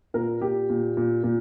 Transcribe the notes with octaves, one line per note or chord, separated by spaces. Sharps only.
A#2 A#4
A#2 G4
A#2
A#2
A#2